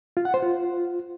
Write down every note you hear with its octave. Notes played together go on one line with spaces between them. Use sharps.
F4
F#5
C5
F4